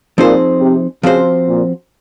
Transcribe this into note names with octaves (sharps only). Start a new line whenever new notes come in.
A#2 F3 C4 D#4 G#4 C5
C3
C#3 F3 C4 F#4 C5
A#2